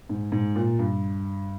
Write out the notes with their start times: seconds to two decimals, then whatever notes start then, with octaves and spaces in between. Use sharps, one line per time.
0.09 G#2
0.32 G#2
0.56 A#2
0.79 G2